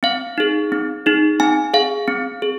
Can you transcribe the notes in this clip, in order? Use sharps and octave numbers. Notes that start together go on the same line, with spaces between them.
C4 F5
D#4 G#4
C4
D#4 G#4
C4 G#5
G#4 F5
C4
G#4